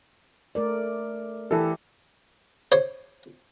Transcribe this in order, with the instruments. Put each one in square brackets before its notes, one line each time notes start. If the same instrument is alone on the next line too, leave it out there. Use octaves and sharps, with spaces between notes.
[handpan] A3 A#4 D5
[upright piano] E3 A4 [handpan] G4 E5
[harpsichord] C5 C#5